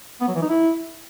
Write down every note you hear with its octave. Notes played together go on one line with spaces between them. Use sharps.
B3
F#3
E3
D#4
E4